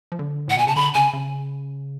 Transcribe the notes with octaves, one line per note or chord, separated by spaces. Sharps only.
F3
D3
A2 F#5
B2 G#5
C#3 A5
D3 B5
C#3 G#5
C#3